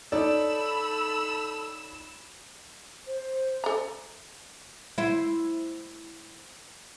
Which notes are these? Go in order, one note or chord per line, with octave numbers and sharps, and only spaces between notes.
D#4 A4 C#5 D5 B5 E6
C5
A4 A#5
E4 C5